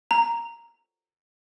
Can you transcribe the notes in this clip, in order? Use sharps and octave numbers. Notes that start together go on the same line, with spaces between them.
A#5